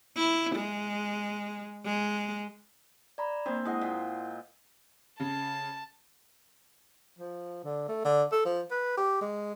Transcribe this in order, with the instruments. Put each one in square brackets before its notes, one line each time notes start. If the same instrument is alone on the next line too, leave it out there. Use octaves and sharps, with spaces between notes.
[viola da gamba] E4
G#3
G#3
[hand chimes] D5 A#5 B5
[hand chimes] A#3 D4 [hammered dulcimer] C4
[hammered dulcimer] G#3 D#5 [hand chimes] E4 F#5
[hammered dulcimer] A#2
[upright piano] C#3 [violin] A5
[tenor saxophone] F3
D3
A3
D3
A4
F3
B4
G4
G#3